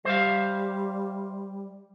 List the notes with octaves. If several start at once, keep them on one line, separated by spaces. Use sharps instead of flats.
G3 C5 E5 F5